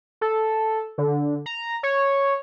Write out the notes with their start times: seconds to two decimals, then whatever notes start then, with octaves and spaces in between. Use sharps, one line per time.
0.21 A4
0.98 D3
1.46 A#5
1.83 C#5